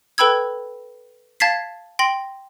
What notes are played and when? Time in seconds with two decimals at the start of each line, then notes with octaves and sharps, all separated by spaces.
0.18 A4 B4 G5 B5 E6 G#6
1.40 F5 A5 G#6 A6 B6 C7
1.99 G5 C6 A#6 F#7